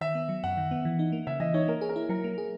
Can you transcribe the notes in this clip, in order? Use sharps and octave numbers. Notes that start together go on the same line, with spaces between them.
D#3 E5
B3
F#3
F#2 F#5
D#3
B3
E3
D#4
A#3
C#3 E5
E3 D#5
D#4 C#5
A#3 A#4
G#4
A#4
E4
F#3 A#4
A#3
G#4